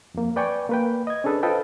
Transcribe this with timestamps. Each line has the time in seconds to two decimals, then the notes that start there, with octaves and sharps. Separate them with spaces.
0.14 F2 A#3
0.36 B4 D5 G5 G#5 C#6
0.69 A#3 B4 G5
1.07 D#5 G#6
1.24 C#4 D4 G#4 A4 B4
1.43 F4 A4 B4 C5 D#5 G5